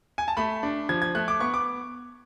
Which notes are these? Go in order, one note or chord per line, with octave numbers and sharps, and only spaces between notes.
G#5
A5
A3 B5
D4
F3 G#6
G#6
A3 F#6
D6
B3 C#6
D6